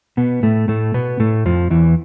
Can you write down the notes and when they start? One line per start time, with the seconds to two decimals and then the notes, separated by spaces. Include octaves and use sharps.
0.17 B2 B3
0.43 A2 A3
0.68 A2 A3
0.94 B2 B3
1.20 A2 A3
1.46 F2 F3
1.70 E2 E3